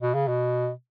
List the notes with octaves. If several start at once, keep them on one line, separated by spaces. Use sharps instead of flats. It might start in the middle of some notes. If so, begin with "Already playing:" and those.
B2
C#3
B2